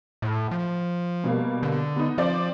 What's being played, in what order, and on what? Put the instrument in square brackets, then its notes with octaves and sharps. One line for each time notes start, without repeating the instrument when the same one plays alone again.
[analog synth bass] A2
F3
[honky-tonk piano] B2 G3 A#3
[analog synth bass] D3
[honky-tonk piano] B3 D#4
[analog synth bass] F3 [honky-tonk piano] C4 D5